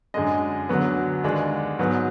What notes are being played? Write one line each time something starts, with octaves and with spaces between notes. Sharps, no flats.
F#2 D3 G#3 D#5
D2 D3 F#3 B3
D#2 D3 G#3 D4
G#2 F#3 B3